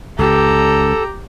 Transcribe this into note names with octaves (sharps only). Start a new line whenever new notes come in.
C#2 G4 A4 A#5